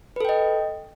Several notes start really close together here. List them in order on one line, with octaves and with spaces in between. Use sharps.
B4 A4 G5 D#5